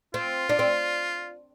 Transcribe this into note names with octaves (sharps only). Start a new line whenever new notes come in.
C4 F4
D4
C4